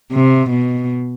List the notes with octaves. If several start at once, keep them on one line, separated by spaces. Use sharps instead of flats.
C3
B2